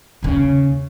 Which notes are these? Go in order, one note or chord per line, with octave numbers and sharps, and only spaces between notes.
D#2 C#3